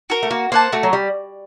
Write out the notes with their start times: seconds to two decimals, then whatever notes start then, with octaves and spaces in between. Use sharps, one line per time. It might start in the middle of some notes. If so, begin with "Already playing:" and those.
0.10 F#4 A#4
0.23 A3
0.31 A#3 F#4
0.52 A#3 C5 F#5 A5
0.72 A3 F#4
0.83 F#3
0.93 G3